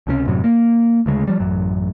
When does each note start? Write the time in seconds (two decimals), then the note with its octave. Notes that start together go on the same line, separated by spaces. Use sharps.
0.07 C#2 C3 F3 C#4
0.27 F#2 A2 C3 F#3
0.44 A#3
1.06 D2 C#3 G3 G#3
1.28 F3 G3
1.40 A1 F#2 F#3